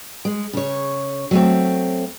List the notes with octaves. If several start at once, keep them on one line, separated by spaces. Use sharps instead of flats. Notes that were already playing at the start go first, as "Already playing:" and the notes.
G#3
C#3 C#5
F#3 A3 C4